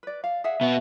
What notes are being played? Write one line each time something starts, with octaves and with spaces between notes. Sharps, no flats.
B4 D5
F5
G#4 E5 F#5
B2 B3 E5